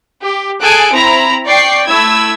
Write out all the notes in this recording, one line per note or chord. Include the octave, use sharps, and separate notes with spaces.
G4
G#4 A4 G#5 F#6 D7
C4 E4 A#5 B5
D5 G5 C#6 C7
A3 E4 E6 G#6